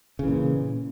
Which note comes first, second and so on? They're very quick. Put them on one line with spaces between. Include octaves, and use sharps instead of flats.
C#3 E3 A#2